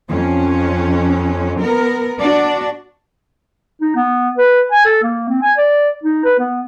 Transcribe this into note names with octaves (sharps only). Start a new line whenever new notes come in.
F2 C#4
B3 A#4
D4 F#4 D5
D#4
B3
B4
G#5
A4
A#3
C4
G#5
D5
D#4
B4
B3